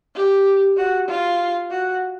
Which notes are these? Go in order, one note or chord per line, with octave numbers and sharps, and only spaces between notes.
G4
F#4
F4
F#4